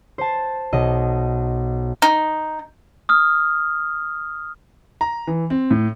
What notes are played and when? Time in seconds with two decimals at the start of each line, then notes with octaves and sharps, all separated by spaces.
0.18 C5 A5
0.72 B1 D#5
2.02 D#4
3.09 D#6 F6
5.01 A#5
5.27 E3
5.50 C4
5.71 A2